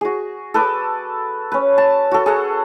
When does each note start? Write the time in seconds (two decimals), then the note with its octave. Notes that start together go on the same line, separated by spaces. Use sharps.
0.01 F#4 G#4
0.54 A4 B4 D6 D#6
1.52 C#4 B4
1.78 A5
2.11 F#4 A4
2.26 G#4 A4 F#5